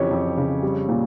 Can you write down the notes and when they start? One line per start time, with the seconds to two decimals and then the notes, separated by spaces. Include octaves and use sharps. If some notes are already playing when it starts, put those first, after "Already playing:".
Already playing: F2 C#3 E3 G4 C#5
0.11 F2
0.37 C#3
0.62 G3
0.89 A#2